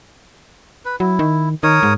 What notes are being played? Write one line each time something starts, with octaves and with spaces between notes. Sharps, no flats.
B4
F#3 E4
D#3
D#3 A#4 C#5 D#6
G#2